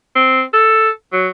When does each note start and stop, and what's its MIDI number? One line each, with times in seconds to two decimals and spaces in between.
0.15 0.42 60
0.53 0.90 69
1.12 1.28 54